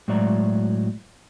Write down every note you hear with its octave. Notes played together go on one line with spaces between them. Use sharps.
A2 F#3 G#3 F#4 D5 A#5